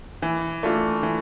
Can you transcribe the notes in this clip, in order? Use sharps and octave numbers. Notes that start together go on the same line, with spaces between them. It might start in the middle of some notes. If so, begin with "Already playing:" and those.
E3
A3 D4 F4
E3